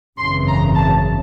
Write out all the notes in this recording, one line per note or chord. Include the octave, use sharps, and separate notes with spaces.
G#1 F#2 C#3 E3 C6
A#5
A5